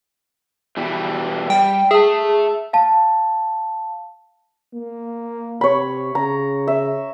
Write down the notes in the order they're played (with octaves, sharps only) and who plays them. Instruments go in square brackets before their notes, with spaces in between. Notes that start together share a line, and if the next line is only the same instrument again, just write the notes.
[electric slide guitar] B2 E3 G3
[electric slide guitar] G3 [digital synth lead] G5
[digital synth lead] G#4 [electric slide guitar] E5 A5
[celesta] F5 A5
[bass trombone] A#3
[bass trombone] C3 [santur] C#5 B5
[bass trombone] C#3 [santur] A#5
[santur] E5